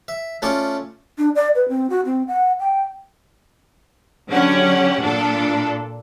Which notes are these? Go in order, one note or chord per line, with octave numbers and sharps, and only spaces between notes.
E5
A3 C#4 F4 D5 C#6
D4
D5
B4
C4
F#4
C4
F#5
G5
D3 F#3 C#4 G4 F#5
A#2 D4 A4